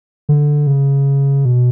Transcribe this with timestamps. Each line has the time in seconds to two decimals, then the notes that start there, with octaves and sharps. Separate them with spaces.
0.29 D3
0.67 C#3
1.45 B2